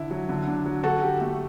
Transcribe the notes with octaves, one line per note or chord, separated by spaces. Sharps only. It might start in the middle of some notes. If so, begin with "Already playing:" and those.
Already playing: D3 E4
F#3
D3
D4
F#3
D3 F#4 A4
G4
A3